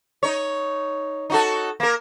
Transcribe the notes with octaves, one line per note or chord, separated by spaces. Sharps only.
D#4 C#5
D#4 F#4 A4
A#3 A#4